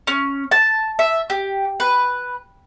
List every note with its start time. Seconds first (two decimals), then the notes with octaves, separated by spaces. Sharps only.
0.07 C#4
0.51 A5
0.99 E5
1.30 G4
1.80 B4